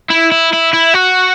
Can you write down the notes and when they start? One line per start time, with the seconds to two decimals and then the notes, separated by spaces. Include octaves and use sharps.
0.10 E4
0.32 E4
0.53 E4
0.73 E4
0.94 F#4